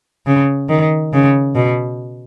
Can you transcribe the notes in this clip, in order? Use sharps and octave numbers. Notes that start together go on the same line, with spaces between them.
C#3
D#3
C#3
B2